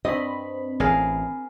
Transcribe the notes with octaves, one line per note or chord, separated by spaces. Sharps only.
G2 C4 D#5 B5
A1 G#4 A#4 F5